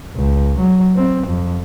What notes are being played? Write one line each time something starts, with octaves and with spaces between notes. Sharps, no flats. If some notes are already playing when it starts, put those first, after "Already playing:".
C#2
F#3
C4
F2